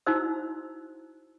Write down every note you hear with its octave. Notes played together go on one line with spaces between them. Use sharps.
D#4 E4 F#4 C5 E6